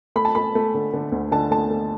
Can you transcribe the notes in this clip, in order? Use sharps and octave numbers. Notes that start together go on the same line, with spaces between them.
A3 B5
A5
A3 B5
A3
D3
D3
D2
D3 A5
A3 A5
A3